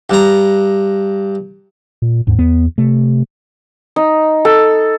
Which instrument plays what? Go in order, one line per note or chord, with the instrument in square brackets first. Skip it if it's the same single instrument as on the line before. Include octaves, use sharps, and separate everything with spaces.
[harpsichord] G2 A#5
[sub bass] A#2
[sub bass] D#2 [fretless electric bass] G#2
[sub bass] E2 [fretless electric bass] B3
[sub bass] C3 [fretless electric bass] A3
[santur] D#4
A4